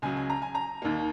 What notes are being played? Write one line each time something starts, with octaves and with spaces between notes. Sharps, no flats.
C#2 C#3 F#3 G#5
G#5
A#5
G#5
A#5
D#2 D#3 A#3